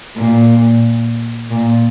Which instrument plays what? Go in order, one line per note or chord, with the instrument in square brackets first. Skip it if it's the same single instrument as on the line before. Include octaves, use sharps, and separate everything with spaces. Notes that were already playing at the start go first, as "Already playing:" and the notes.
[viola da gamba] A#2
A#2